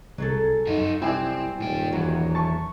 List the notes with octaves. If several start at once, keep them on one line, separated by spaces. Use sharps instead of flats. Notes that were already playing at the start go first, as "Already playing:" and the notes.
C2 F#3 G#4 A4 A6
F#2 D#4 F#4
C2 F#2 C4 E4 D5 G5 G#5
D#1 G2 G5
E2 F#3 F#4
A5 C#6